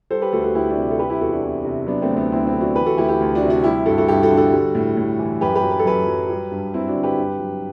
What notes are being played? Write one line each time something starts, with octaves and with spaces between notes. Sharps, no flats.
G3 A4 C5
G4 B4
D2 F#4 A4
F#4 A4
D2 E4 G4
D4 F#4
C3
A4
G3 G4 B4
E4 G4
E2 F#4 A4
D4 F#4
E2
C3
F#3 B3 D4
A3 C4
D2
B3 D4
D2 C4 E4
C4 E4
D3
D4 F#4
E3 G4 B4
F#4 A4
D2 E4 G4
E4 G4
D2
D4 F#4
C3
D4 F#4
G3 E4 G4
G2 F#4 A4
F#4 A4
G2 E4 G4
F#4 A4
D3
F#4 A4
G3
A2
A2
E3
F#2 G4 B4
G4 B4
F#3
B4
A4
F#2 G4 B4
F#3
G3
G2
G2 C4 E4
D4 F#4
D3
G4 B4
G2
F#3